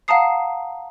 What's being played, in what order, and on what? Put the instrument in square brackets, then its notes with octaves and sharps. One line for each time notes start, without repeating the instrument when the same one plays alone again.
[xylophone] F5 F#5 A5 A#5 D#6 C7